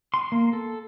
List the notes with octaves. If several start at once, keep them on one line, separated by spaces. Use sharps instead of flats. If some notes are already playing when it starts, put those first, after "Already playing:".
C6
A#3
A4